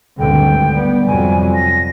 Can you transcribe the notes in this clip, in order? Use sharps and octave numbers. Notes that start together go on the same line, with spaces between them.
G#1 D2 G2 D3 G5
G3 B3
F2 C3 F#3 G#5
A#6